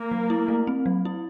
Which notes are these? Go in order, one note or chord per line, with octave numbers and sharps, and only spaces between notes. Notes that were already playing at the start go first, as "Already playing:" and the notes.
Already playing: A#3
F#3
E4
A3
C4
F#3
E4